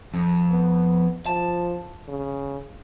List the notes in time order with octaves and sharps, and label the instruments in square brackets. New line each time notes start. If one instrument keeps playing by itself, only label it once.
[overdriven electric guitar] F2
[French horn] B3
[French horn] F3 [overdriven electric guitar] A5
[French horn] C#3